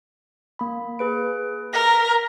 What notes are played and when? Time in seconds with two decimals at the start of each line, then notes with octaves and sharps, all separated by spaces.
0.59 A#3 B5
0.99 G#4 B4 D7
1.74 A#4 A#6 B6